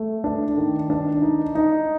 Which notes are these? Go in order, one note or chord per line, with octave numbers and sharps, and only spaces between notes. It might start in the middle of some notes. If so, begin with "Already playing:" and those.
Already playing: A3
D4
D#3
D4
D#4
D#4